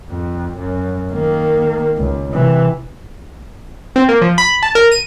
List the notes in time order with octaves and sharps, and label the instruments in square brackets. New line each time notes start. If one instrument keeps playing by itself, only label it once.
[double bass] F2
F#2
D#3 A#3
C#2
C3 E3
[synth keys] C4
A#3
F3
B5
A5
A#4
D#7